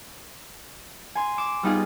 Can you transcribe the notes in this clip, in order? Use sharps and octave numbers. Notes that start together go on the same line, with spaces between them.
G#5 C6
D6 D7 E7
G3 B3 D#4 F4 G#4